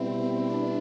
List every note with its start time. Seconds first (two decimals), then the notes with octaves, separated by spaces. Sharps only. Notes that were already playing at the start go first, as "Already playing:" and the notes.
Already playing: B2 G3 B3 C4 E4
0.49 D4